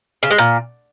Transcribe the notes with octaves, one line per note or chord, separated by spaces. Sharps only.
C#3
G#3
A#2